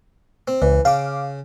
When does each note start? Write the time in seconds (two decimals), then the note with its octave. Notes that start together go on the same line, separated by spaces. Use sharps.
0.48 C4
0.62 C#2 E3
0.85 C#3 F5 D6